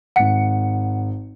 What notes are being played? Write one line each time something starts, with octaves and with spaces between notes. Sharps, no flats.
G#1 F#5 C#7